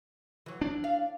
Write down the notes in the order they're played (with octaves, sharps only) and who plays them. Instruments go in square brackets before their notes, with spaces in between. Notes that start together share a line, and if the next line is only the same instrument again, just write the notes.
[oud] E3 F#3
[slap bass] D4
[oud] F5